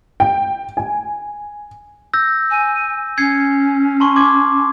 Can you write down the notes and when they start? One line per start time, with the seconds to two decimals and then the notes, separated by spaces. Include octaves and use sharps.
0.20 G5
0.77 G#5
2.14 E6 G6 A#6
2.51 G#5
3.18 C#4 G#6 C7 C#7
4.00 A5 C6 C#6
4.16 C6 D6 G#6